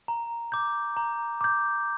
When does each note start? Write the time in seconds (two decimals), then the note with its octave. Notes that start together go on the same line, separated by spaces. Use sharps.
0.08 A#5
0.52 D6 G6
0.97 A#5
1.41 D6 G6